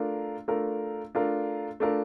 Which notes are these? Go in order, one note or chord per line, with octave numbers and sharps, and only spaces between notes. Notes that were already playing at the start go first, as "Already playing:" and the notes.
Already playing: A3 D4 F4 A#4
A3 D4 F4 A#4
A3 D4 F4 A#4
A3 D4 F4 A#4